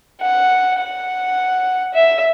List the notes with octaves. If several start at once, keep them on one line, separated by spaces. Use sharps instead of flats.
F#5
F#5
E5